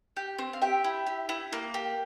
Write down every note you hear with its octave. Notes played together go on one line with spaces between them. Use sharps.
G4
C4
F5
G4 E5 G5
E4
G4
E4
A#3
G4